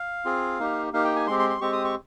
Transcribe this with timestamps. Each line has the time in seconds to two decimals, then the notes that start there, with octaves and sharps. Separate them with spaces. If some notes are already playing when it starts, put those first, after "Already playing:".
Already playing: F5
0.25 C4 F4 G#4
0.59 A#3 D#4 G4
0.93 A#3 D#4 G4 F5
1.04 G5
1.16 G#5
1.27 G#3 C4 G4 C6
1.39 C6
1.50 C6
1.61 G#3 C4 G4 C#6
1.73 D#6
1.85 C#6